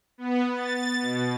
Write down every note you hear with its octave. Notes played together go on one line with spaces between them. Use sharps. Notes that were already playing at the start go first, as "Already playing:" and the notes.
B3
A6
B2